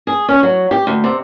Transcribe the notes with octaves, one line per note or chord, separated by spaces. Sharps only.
G#4
C#4
F#3
G4
D2
C3